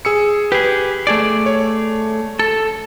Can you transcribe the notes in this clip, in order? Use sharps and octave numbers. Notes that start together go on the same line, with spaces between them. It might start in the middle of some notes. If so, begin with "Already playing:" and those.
G#4 E6 C#7
G4 G#4 B4
A3 G#4 D5
C#5
A4